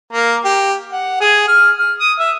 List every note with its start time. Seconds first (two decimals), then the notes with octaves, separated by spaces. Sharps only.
0.13 A#3
0.45 G4
0.92 F#5
1.21 G#4
1.48 F6
1.78 F6
1.99 D#6
2.19 E5